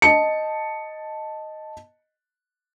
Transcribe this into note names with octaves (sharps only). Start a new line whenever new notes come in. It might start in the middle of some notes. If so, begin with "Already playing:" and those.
D#5 A5 C#7